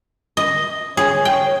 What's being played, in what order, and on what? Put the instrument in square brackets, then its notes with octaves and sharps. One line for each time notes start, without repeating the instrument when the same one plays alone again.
[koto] D#5
[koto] G#4 [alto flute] C#5
[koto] G5